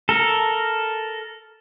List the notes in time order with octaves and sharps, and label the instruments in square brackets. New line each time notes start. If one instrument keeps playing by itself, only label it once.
[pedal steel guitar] A4 A#4